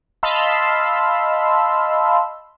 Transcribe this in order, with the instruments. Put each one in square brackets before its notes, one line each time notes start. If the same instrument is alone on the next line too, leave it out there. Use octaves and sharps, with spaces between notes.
[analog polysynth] D#5 F5 A5 B5 C6 E6